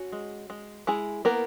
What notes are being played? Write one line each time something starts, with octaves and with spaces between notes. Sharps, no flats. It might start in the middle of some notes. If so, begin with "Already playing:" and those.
Already playing: C#4 F#4
G#3
G#3
G#3 E4 G#4
A#3 B3 A#4